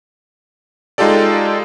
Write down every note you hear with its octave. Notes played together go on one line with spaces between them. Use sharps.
G#3 D#4 F4 G4 A4 D5